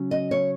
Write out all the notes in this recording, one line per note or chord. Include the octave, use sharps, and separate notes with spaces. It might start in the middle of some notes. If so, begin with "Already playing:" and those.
Already playing: C#3 F#3 C#4
D#5
C#5